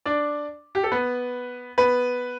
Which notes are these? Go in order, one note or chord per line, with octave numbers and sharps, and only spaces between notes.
D4 D5
G4
A4
B3 B4
B3 B4